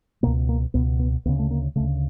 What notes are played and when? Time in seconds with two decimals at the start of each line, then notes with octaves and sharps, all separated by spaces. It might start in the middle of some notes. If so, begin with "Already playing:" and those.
0.23 C#2 B2 A#3
0.49 A#3
0.74 C#2 B2 B3
0.99 B3
1.25 D2 B3
1.29 C#3
1.39 A3
1.51 A#3
1.76 C#3 A3
1.80 D2